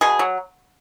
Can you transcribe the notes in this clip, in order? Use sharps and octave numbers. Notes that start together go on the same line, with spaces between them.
B2 G#4
F#3